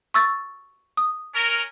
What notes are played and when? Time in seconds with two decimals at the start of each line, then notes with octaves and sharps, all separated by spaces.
0.14 C#6 E6 A6
0.97 D#6
1.34 C#4 A#4